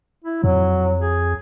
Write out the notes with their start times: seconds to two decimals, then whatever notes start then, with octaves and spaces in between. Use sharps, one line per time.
0.24 E4
0.44 F2 F#3
1.00 G#4